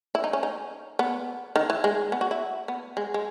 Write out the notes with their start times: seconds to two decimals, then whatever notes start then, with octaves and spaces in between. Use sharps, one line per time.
0.15 E4
0.24 D#4
0.33 C#4
0.43 D#4
0.99 B3
1.56 D#3
1.70 E3
1.84 G#3
2.12 B3
2.21 F#4
2.31 E4
2.68 B3
2.97 G#3
3.14 G#3